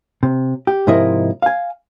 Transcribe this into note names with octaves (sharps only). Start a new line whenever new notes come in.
C3
G4
G#2 C3 F3 E4 A#4 D#5
F5 G#5